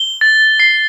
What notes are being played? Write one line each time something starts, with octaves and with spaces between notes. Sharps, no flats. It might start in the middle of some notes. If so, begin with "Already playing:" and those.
Already playing: G7
A6
C7